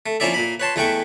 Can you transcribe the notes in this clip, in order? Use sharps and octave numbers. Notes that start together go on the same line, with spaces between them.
A3
F3 A#3 C#4 E4 D5 E5
A#2 A#3 B5
B4 C#5 A5 C6
E2 G#3 A3 B4 G5 C#6